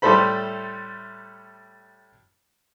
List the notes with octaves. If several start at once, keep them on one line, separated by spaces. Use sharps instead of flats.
A2 G3 A3 A4 C5 B5